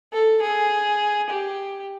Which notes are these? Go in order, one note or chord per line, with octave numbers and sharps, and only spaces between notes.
A4
G#4
G4